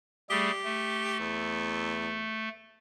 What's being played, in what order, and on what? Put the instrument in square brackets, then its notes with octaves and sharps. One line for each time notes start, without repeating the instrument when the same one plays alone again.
[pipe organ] G3 A3 G#4 [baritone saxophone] G4
[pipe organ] A3
[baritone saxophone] E2